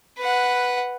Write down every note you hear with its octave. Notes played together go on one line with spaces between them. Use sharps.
B4 F#5